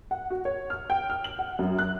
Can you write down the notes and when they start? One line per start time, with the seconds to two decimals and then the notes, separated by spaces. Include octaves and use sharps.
0.11 F#5
0.30 F#4
0.45 C#5
0.70 F6
0.90 G5
1.10 F6
1.24 F#7
1.39 F#5
1.59 F#2
1.79 F#6